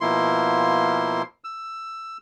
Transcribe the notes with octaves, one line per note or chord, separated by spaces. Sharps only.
B2 F3 A#3 E4 C6
E6